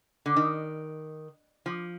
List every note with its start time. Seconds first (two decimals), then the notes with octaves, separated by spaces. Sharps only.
0.26 D3
0.36 D#3
1.66 F3